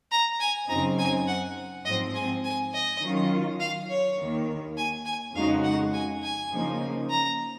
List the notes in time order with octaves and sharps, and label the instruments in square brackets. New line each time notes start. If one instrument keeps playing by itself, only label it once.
[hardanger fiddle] A#5
G#5
[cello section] F#2 C#3 F#3 C4 D#4 [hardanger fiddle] A#5
[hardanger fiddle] G#5
F#5
[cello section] G#2 F3 C4 [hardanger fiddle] D#5
[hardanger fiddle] G#5
G#5
D#5
[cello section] D#3 F#3 C#4 F4
[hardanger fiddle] F5
C#5
[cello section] D#2 D#3 A#3
[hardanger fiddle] G#5
G#5
[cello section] F2 C#3 G#3 D#4 F#4 [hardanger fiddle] F5
[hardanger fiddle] F#5
G#5
G#5
[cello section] C#3 F3 A#3 D#4
[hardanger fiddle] A#5